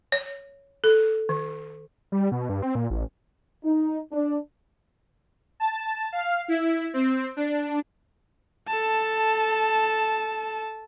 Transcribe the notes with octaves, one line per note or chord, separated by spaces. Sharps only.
C#5
A4
D#3
G3
B2
G2
C4
A#2
A1
D#4
D4
A5
F5
E4
C4
D4
A4 A5